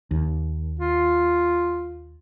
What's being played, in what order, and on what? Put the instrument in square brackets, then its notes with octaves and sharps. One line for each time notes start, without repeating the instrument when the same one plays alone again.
[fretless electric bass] D#2
[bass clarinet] F4